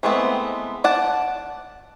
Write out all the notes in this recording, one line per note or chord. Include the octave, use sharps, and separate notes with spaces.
E3 G#3 A3 B3 C4
D5 F#5 A5